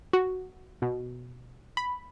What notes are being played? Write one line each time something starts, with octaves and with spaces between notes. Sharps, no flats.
F#4
B2
B5